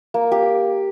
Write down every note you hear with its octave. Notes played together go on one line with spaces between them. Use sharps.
A#3
G4